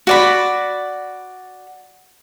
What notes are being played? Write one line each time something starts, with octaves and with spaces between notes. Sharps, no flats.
F#4 D5 B5